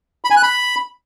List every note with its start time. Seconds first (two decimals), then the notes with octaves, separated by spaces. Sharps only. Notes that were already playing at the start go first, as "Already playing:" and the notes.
0.25 B5
0.31 G#5
0.37 F#6
0.43 B5